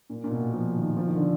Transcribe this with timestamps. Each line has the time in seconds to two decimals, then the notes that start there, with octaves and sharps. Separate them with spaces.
0.10 A#2
0.24 A#2
0.31 B2
0.53 F3
0.76 D#3
0.97 F3
1.07 D#3
1.16 D3